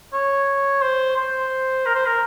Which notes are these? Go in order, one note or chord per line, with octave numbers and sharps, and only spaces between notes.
C#5
C5
C5
A#4
C5
A#4